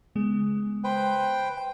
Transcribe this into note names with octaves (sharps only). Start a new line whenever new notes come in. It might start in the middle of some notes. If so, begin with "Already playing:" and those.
C#3 G#3 B3
B4 C5 G5
G5